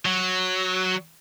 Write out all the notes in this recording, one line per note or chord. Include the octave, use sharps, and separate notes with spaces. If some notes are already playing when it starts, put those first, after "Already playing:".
F#3